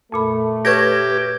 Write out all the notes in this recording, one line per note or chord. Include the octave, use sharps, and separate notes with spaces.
F2 A#2 A3 B5
G4 B4 C#5 C#6 G#6 A#6